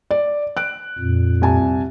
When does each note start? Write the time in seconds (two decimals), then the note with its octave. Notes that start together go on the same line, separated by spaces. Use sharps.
0.11 D5
0.57 F#6 D7
0.99 F2 A#2
1.42 C2 G#5 A5